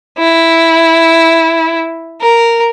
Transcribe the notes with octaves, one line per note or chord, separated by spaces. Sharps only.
E4
A#4